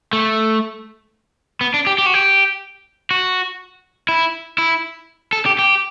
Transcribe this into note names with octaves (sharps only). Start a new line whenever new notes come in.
A3
B3
D4
G4
G4
F#4
G4
F#4
E4
E4
A4
G4
G4